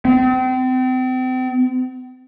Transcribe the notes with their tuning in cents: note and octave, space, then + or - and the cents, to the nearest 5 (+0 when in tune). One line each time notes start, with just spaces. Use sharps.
C4 -35